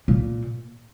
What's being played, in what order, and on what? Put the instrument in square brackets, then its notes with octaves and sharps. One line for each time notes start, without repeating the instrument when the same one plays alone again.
[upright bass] A#2